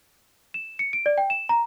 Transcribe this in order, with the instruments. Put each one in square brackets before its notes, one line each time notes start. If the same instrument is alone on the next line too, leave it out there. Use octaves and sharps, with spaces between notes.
[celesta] E7
C#7
D7
D5
G5
E7
A#5